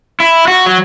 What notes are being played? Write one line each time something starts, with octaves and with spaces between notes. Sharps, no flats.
E4
F#4
F#3